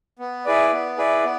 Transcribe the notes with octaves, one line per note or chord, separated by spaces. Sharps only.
B3
E4 G#4 B4 D5
B3
E4 G#4 B4 D5
B3